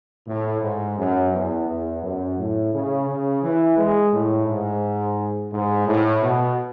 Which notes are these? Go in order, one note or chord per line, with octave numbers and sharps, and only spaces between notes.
A2
G#2
F#2
E2
E2
F#2
A2
C#3
C#3
E3
G#3
A2
G#2
G#2
A2
B2